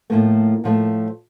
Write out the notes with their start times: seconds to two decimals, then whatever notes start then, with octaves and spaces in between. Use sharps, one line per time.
0.10 A2 F3 A3 A#3
0.64 A2 F3 A3